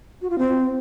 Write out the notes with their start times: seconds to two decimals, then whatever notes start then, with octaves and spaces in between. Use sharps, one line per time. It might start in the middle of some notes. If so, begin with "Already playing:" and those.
0.22 F#4
0.30 F4
0.38 C4